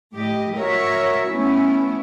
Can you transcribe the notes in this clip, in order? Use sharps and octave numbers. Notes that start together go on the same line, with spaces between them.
A2 G4 D#5
F#4 A#4 C#5 E5
A3 B3 C#4 E4